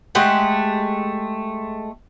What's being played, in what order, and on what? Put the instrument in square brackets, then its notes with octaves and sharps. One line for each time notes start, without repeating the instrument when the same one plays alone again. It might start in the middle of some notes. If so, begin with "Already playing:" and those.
[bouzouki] G#3 A3 G4 F#5